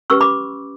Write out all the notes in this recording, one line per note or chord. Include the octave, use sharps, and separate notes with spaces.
C#4 G4 B4 C#6 E6
B5 D6